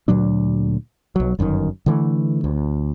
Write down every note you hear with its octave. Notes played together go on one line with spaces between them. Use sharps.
D2 A#2 F#3 D4
B1 F#3
G1 F#2 D3 D#3
D3 E3 A3
D2